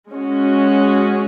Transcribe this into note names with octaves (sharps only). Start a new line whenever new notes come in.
G#3 C#4 F#4